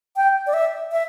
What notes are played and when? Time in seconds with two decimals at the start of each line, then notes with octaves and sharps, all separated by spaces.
0.17 G5
0.47 D5
0.54 E5
0.92 E5